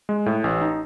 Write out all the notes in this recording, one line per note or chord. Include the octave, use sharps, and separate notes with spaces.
G#3
A2
A1
D#4